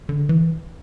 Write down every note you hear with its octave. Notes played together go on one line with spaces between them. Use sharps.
D3
E3